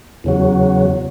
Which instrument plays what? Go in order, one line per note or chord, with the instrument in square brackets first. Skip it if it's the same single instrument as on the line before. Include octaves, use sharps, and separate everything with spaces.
[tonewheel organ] E2 C#3 F#3